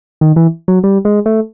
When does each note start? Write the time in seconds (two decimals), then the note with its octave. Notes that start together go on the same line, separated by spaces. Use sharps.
0.21 D#3
0.36 E3
0.68 F#3
0.84 G3
1.05 G#3
1.26 A3